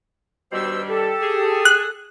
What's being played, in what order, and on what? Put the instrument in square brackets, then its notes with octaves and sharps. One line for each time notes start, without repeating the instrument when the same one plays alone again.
[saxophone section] G2 D#3 G3 [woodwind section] B2 C5 E6
[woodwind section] G4 A4
[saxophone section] G#4
[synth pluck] F#6